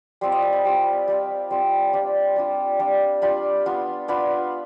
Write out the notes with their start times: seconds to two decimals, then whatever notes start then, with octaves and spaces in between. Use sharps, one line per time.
0.21 G3 C4 F4 C6
0.32 D#5
0.42 G5
0.53 B5
0.65 G3 C4 F4
1.08 G3 C4 F4
1.51 G3 C4 F4 C6
1.93 G3 D4 F4
2.36 G3 D4 F4
2.79 G3 D4 F4
3.22 G3 D4 F4 B5
3.66 B3 D4 F4
4.08 B3 D4 F4 B5